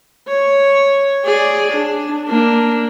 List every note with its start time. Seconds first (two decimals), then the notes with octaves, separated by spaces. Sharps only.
0.28 C#5
1.25 G#4 D5
1.72 D4
2.28 A#3 D4